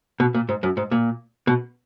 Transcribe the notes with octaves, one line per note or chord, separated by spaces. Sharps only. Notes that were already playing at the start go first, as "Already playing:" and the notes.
B2
A#2
G#2
F#2
G#2
A#2
B2